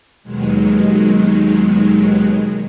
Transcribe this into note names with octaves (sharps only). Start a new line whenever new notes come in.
D#2 B2 D#3 F#3 G#3